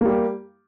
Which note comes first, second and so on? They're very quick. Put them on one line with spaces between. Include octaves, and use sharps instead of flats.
A#3 G3 G4